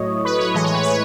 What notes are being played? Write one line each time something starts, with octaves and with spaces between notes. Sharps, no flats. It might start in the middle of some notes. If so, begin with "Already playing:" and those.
Already playing: A2 F#3 A3 C#5 D#5
B4
C#5
A2 E3 G#3 D#5
C#5
B4
C#5